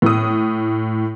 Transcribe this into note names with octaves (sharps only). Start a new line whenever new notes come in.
A2 D#6